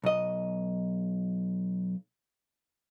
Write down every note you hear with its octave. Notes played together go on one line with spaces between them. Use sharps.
B1 D#5